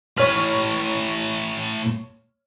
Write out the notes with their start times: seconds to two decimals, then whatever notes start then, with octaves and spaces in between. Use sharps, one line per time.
0.18 A2 B4 C#5 F6